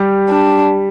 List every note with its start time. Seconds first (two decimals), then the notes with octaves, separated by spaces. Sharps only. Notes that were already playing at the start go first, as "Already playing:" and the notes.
Already playing: G3 G4
0.29 D4